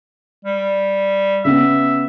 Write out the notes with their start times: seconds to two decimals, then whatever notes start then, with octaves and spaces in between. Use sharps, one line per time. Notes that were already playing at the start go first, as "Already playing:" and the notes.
0.45 G3
1.45 C#3 B3 E5